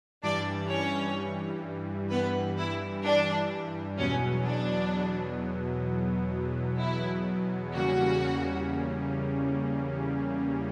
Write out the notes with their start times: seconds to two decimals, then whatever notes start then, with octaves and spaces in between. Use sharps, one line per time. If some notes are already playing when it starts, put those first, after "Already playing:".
0.22 G2 E3 G3 D4 D5
0.70 C#4 C#5
2.10 B3 B4
2.58 E4
3.04 D4
3.98 E2 B2 F#3 B3 C#4
4.45 D4
6.79 E4
7.73 E2 C#3 G3 A#3 C#4 F#4